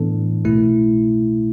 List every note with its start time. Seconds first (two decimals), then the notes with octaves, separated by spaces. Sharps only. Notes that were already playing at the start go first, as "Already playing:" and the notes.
Already playing: A2 E3 B3 D4 A4
0.45 C2 B2 A3 E4